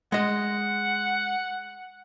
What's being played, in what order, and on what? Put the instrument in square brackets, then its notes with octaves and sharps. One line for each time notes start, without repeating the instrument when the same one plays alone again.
[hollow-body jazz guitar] G#3 D#5 [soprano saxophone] F#5